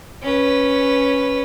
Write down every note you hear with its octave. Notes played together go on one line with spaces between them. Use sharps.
C#4 B4